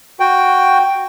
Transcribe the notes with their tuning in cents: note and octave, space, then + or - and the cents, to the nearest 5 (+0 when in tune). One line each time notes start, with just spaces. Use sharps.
F#4 +0 G5 +0